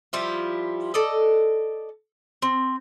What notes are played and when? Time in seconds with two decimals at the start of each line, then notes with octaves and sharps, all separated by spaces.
0.13 F3 G3 E4 F4
0.94 A4 D5 D#5
2.42 C4